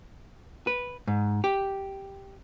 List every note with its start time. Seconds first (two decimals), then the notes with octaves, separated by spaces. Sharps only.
0.67 B4
1.07 G#2
1.44 G4